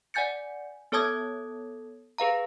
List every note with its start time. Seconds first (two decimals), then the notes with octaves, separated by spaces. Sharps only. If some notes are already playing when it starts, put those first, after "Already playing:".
0.14 D5 F#5 G#5 G6 A6 C#7
0.92 B3 A4 C#5 A5 D#6 G#6
2.18 G#4 B4 F5 A#5